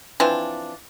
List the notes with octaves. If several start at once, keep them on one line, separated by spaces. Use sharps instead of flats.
E3 F3 C4 D4